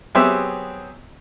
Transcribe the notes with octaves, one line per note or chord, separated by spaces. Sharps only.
F#3 B3 C4 G4 G#4 E5